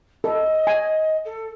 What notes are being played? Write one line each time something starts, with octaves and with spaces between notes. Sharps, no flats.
A4 D#5
G#5
A4